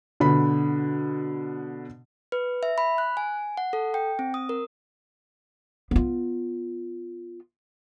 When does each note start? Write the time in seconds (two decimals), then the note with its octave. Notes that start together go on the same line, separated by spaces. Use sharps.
0.20 B2 D3 B5
2.32 B4
2.63 E5
2.78 B5
2.98 F#6
3.17 G#5
3.57 F#5
3.73 A4
3.94 G5
4.19 C4
4.34 D#6
4.49 A#4
5.91 B3 F4